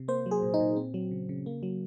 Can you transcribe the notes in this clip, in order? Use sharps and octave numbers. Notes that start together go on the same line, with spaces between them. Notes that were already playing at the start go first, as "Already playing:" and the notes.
Already playing: C3
A#3 C5
F#3
G#4
A#2
D#4
A#2
C4
F#3
C#3
C#3
A#3
F#3